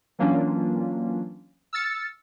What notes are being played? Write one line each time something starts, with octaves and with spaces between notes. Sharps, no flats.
E3 F#3 A#3 C#4 D4 F4
E6 F6 A6 C#7